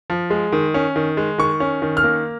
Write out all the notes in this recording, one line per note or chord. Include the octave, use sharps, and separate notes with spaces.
F3
G#3
D#3
C#4
D#3
G#3
D#3 C#6
C#4
D#3
F6
A#3